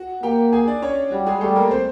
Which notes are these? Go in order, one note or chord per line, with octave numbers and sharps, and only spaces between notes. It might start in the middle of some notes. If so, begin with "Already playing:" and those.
Already playing: F#4 F#5
A#3 G4 G5
G#4 G#5
D4 D5
C#4 C#5
G3 F#4
G#3 G#4
G3 A3 A4
A#3 A#4
C4 C5